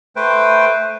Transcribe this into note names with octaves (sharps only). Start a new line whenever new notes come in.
A3 B4 C5 G5